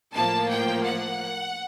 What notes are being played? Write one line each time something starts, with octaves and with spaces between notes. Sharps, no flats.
A2 F3 A#3 A5
G5
F#5